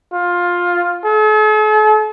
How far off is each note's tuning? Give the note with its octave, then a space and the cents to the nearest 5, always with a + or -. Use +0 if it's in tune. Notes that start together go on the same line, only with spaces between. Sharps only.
F4 +15
A4 -45